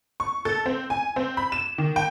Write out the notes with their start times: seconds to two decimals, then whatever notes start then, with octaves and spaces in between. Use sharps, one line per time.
0.20 C#6
0.45 A4
0.66 C4
0.90 G#5
1.16 C4
1.37 B5
1.52 E7
1.78 D#3
1.96 G5